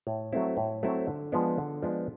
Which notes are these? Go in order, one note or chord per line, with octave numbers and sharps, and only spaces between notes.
A2
F#3 A3 C4 E4
A2
F#3 A3 C4 E4
D3
F3 G#3 B3 D4
D3
F3 G#3 B3 D4